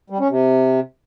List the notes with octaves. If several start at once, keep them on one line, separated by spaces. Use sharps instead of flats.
G3
C#4
C3